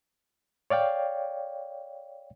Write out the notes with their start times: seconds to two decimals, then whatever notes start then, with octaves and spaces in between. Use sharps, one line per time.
0.70 C#5 D5 F5 G5